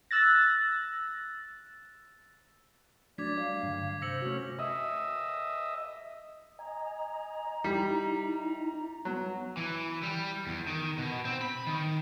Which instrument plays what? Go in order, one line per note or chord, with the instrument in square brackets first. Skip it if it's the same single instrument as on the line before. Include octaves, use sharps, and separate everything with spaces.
[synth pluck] E6 F#6 A6 A#6
[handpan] F#3 A3 D4 [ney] D5 [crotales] D6 G#6 B6
[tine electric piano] G3 D5 [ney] F5
[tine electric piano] G2 D3
[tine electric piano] C3 E6 C#7 [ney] C5 [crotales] A#6 F#7
[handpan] A3 F#4 [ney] C#4
[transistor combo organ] D#5 E5
[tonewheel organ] D#5 G#5 [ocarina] A#5
[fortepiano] G3 [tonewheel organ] D#4 E4
[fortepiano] F#3 [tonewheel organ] B3
[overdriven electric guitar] E3
G3
E2
D#3
B2
C4
B5
D#3